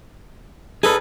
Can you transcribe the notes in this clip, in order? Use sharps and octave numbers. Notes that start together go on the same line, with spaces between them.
D#4 G#4 A4 B4